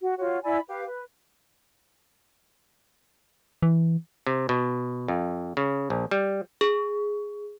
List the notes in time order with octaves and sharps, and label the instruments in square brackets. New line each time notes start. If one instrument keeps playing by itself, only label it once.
[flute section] F#4
F4 F#4 C#5
E4 D5 G#5 B5
G4 B4 F5
B4
[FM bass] E3
[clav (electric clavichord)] C3
B2
F2
C#3
A#1
G3
[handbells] G#4